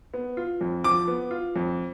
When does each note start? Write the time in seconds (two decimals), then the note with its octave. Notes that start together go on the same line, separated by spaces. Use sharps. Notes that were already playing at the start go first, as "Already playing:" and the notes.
0.14 B3
0.37 F4
0.61 F2
0.84 F3 D6
1.08 B3
1.31 F4
1.56 F2